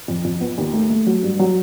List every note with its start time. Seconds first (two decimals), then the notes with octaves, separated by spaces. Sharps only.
0.08 F2
0.25 F2
0.41 B3
0.58 D#2
0.73 A3
0.90 A3
1.07 F#3
1.23 G2
1.39 F#3